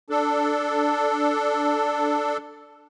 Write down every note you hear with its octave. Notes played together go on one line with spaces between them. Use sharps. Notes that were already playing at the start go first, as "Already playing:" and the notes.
D4 A4